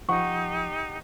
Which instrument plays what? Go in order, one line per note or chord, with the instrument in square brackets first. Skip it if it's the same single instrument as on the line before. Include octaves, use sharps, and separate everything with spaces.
[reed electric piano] F3 [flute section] D#4 G4 [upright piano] F#5 [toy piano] C#6